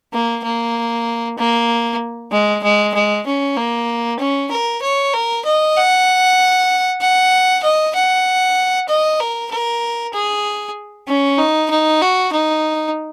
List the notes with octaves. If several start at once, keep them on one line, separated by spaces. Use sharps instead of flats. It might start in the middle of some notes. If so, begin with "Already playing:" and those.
A#3
A#3
A#3
G#3
G#3
G#3
C#4
A#3
C#4
A#4
C#5
A#4
D#5
F#5
F#5
D#5
F#5
D#5
A#4
A#4
G#4
C#4
D#4
D#4
F#4
D#4